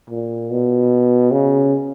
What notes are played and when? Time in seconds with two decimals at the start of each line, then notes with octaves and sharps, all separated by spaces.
0.10 A#2
0.50 B2
1.31 C#3